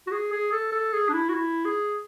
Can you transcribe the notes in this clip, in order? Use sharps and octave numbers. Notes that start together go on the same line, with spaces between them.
F#4
G#4
G#4
A4
A4
G#4
D4
E4
F#4
E4
G#4